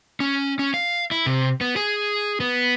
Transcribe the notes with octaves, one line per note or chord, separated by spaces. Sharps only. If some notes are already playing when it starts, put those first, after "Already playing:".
C#4
C#4
F5
E4
C3
B3
G#4
B3